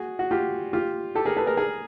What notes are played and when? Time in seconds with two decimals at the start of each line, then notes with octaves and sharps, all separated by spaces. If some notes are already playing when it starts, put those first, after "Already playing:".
Already playing: F#4 G#4
0.19 F#4
0.31 F4 G4
0.73 F4 G4
1.15 G4 A4
1.25 G#4 A#4
1.37 A4 B4
1.47 G#4 A#4
1.57 G#4 A#4